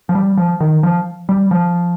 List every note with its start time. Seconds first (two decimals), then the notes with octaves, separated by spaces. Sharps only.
0.09 F3
0.15 G3
0.37 F3
0.60 D#3
0.83 F3
1.29 G3
1.51 F3